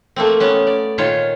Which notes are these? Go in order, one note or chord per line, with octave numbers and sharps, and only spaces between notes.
A3 A#3 C4
B3 C#4
D5
A#2 D#3 F4 C5 C#5